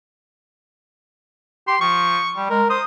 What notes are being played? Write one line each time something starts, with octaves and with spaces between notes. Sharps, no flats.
G4 C6
F3 C#6
G3
G#3 A#4
C5 D#6